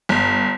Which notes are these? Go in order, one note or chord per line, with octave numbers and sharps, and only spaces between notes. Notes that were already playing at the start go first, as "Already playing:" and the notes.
G1